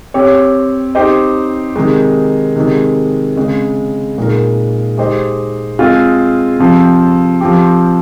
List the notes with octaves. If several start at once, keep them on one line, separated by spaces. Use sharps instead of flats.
C4 G4 C#5
C4 D#4 G4 C5 D#5
C3 D#3 G#3 D#4
C3 D#3 G#3
C#3 G#3 C4
A#2 G#3 D#4 A#4
G#3 D#4 G4 C5 D#5
G#3 C4 F4 G#4
C3 F3 C4
F3 C4 G4